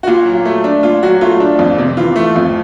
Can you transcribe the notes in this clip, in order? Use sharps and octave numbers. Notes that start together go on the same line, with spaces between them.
F#4
A#2 F4
F#3
A3
D4
A#2 F4
F#3 F#4
A3 F4
D4
F2
C3
E3 F4
A3
F2